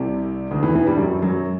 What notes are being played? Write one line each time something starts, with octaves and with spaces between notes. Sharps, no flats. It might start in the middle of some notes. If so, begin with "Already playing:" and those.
Already playing: C2 C3
D2 D3
E2 E3
E2 E3
G2 G3
F#2 F#3
F#2 F#3